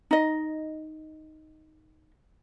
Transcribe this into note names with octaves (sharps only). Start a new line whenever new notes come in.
D#4 D#5